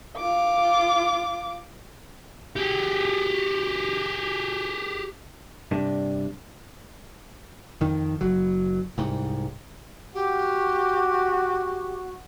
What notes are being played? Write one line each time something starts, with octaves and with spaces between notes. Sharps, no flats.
F4 D6
G4 G#4
G2 C3 D4
F2 D#3
F#1 F#3
C2 G#2
F#4 G4